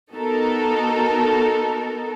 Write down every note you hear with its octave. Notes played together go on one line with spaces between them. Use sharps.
B3 D#4 F#4 A4 A#4